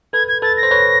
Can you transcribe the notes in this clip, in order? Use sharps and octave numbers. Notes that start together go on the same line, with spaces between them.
A4 B4 G#6
G#6
A4 B4 A6
A#6
C5
B4 C#5